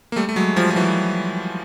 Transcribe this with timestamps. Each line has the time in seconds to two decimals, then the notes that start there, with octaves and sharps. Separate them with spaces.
0.12 A#3
0.16 G3 A3
0.29 A3
0.36 F#3 G#3
0.56 F3 G3
0.70 F3
0.76 E3 F#3